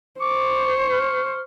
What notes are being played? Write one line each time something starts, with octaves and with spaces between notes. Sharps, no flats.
C5 C#6 D6
F6